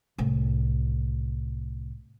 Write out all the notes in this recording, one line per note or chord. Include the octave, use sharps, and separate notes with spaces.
C2 A2